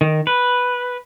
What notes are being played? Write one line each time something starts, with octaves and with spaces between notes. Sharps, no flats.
D#3
B4